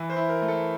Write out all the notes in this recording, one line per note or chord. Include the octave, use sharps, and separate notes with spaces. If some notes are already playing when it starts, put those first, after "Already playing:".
Already playing: E3
C5
E4
A#4
A3
A4